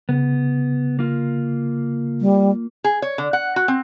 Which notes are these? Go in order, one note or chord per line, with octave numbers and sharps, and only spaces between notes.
C#3 B3
A#3 F4
G3
G#4
C#5
D3
F#5
F#4
C4